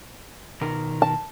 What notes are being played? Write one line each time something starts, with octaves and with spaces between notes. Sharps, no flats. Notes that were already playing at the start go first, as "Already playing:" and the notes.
B2 D#3 A#4
A5